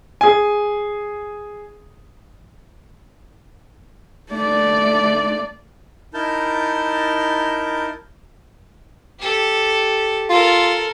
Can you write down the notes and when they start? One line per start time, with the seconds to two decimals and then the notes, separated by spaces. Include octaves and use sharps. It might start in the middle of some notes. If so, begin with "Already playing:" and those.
0.21 G#4 G#5
4.31 A3 D5
6.14 D#4 E4 A#4 A5 G6
9.20 G4 A4
10.30 F4 A4 A#4